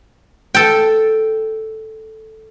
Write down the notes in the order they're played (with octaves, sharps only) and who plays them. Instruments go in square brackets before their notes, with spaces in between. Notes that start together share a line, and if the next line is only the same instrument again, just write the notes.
[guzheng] A4 G5